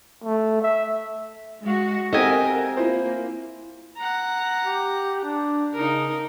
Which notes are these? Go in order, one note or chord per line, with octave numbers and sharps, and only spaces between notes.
A3
E5
G#3 F#4
C4 G4 A4 A#4 D#5 E5 F#5 G#5
A#3 E4 F4 C5
F#5 A#5
G4
D4
C#3 D#4 A#4